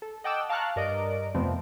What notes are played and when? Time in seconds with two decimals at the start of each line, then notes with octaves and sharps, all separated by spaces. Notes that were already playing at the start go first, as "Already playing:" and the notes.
0.02 A4
0.24 D#5 F#5 G5 A5 D6 E6
0.49 F5 A5 A#5 C#6 F6 F#6
0.76 G2 A#4 D5 D#5 D7
1.34 F2 C3 F3 A3 B3 C4